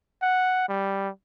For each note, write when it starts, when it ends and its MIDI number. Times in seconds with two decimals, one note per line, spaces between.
0.22 0.69 78
0.69 1.09 55